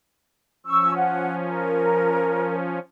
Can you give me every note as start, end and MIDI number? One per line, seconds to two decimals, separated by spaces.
0.66 2.79 53
0.66 2.79 61
0.66 0.93 85
0.66 0.93 88
0.96 1.34 78
1.45 2.55 70